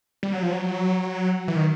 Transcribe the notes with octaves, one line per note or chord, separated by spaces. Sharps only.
G3
F#3
F3
F#3
E3
D#3